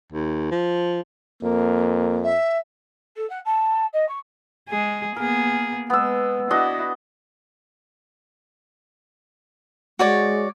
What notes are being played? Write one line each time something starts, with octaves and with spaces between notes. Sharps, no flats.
D#2
F3
F2 A#3
E5
A4
F#5
A5
D#5
C#6
G#3 G#4
A#3 B3 G#4 A#4
G#3 B3 E6
D4 E4 F#4 D#5
G#3 F#4 C#5 D5